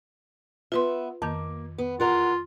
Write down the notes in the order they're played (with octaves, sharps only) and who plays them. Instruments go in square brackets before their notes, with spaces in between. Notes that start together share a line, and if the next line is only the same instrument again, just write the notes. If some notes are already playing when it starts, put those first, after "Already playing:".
[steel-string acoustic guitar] B3 E5 [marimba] F4 B4 C6
[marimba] F2 D#3 [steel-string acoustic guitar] A#3
[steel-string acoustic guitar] B3
[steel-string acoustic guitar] E2 A#4 F#5 [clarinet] F4